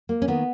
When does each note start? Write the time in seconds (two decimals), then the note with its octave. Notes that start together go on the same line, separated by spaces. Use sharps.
0.09 A#3
0.22 C#4
0.28 D#3 B3